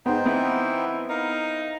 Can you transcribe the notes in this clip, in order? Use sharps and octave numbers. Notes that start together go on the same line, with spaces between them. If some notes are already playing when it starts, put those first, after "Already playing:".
G#2 B3 D#4 C5 G5
E3 B3 C4 E4
D#4 A#4 F5